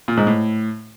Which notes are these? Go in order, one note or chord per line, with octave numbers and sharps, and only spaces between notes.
A#2
G#2
A2